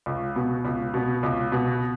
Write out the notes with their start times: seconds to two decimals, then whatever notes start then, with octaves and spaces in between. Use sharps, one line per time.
0.06 C#2
0.36 B2 B3
0.65 C#2
0.94 B2 B3
1.23 C#2
1.52 B2 B3